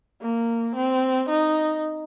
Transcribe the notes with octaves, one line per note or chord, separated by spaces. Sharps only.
A#3
C4
D#4